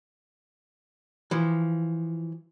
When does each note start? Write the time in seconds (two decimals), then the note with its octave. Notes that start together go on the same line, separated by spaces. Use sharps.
1.31 E3 F3